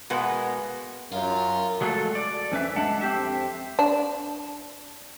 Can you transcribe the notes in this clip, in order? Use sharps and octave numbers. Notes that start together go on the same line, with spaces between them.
B2 G#3 A#3 B3 F#4
F#2 F4 A#4 F5
F3 F#3 G#3 A3 F#4 A4
D5
F2 C#4 B4 E5
F#2 A2 G#3 D4 F#5 A5
F2 C4 G4 E5
D4